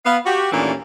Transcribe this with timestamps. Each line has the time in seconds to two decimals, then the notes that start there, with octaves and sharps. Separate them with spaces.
0.05 B3 F5
0.26 F#4 G4
0.52 D#2 A#2 E3 A3 C#4 D4